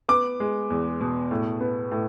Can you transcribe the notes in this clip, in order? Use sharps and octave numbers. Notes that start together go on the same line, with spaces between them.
B3 D6
G#3
E2
B2
A2
B3
A2